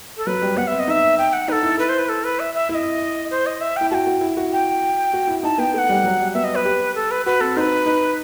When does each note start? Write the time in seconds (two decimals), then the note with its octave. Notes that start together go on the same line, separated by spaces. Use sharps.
0.17 A4
0.27 F#3 B4
0.42 G3
0.57 B3 F#5
0.67 C4 E5
0.79 D#5
0.88 D#4 E5
1.18 G5
1.33 F#5
1.48 D#4 B4
1.52 A4
1.63 E4
1.79 B4
1.89 C5
1.99 B4
2.09 A4
2.24 B4
2.40 E5
2.54 E5
2.69 E4 E5
2.75 D#5
3.31 C5
3.46 D#5
3.61 E5
3.77 E4 G5
3.91 F#4 G5 A5
4.07 F#4
4.21 E4
4.37 F#4
4.52 G5
5.14 F#4
5.28 E4
5.43 D#4 A5
5.58 B3 G5
5.73 A3 F#5 G5
5.89 G3
6.04 F#3
6.20 G3
6.34 B3 E5
6.44 D#5
6.55 B4
6.65 G4
6.95 A4
7.11 B4
7.26 F#4 B4
7.41 C4 A4
7.57 D#4 C5
7.60 B4
7.86 D#4